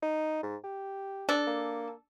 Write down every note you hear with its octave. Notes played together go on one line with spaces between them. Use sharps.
D#4
G#2
G4
D4 A4
A#3